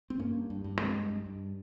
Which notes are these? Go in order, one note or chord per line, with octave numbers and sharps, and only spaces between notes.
C4
G2 A#3 C#4
G2
G2
G2
G2 G#3 C4
G2
G2
G2